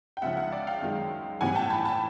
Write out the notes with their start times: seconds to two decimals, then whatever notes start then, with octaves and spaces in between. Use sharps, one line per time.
0.17 G5
0.22 C#2 C#3 F3 E5 F#5
0.37 E5 F#5
0.52 D5 E5
0.67 F5 G5
0.82 F#2 D#3 G#3
1.41 A2 E3 G3 C4 F#5 G#5
1.55 G5 A5
1.70 A5 B5
1.85 A5 B5